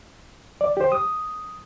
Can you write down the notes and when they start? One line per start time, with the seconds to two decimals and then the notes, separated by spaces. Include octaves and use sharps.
0.61 D5
0.77 G4 C5
0.92 D#6